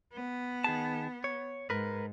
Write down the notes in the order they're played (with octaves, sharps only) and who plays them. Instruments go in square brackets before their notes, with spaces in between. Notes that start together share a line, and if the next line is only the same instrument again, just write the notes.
[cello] B3
[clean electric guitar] D#3 G#4 A5
C#5
[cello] G#2 [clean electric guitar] A#4 B4